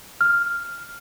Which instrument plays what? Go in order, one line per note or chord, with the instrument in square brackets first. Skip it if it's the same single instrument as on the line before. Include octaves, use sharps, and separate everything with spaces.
[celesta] F6